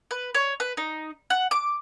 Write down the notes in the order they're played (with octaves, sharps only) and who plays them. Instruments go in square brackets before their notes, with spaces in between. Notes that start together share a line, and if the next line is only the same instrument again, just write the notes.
[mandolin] B4
C#5
B4
D#4
F#5
D6